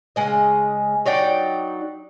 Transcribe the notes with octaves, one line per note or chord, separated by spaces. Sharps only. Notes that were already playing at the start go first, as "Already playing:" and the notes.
C#3 G#3 D#5
F#3 D#4 D5 G5